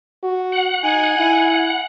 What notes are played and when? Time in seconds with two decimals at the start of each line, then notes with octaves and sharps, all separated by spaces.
0.23 F#4
0.52 F#5
0.84 D#4 G#5
1.19 E4